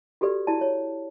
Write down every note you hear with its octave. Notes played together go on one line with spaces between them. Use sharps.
F#4 G4 A4 B4 D5
E4 F#4 D5 A5
C#5